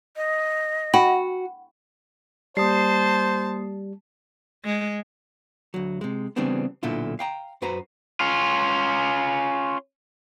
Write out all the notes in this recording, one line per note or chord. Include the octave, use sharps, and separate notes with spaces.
D#5
F#4 G5 B5 F#7
G3 A#3 C5 A5 D#6 C7
G#3
D2 F#3
C3 G#3
C#3 E3 G3 B3 C4 D4
B1 A#2 D3 E4 F4
F5 G5 A#5
F#2 F#4 B4 C5 A#5
C#4 F4